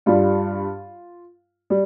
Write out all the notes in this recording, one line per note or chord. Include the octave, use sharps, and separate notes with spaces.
G2 G3 F4
G3